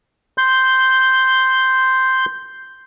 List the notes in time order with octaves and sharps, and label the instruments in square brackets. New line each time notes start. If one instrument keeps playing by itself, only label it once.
[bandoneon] C6 G6